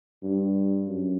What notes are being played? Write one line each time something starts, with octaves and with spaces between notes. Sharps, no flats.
G2
F#2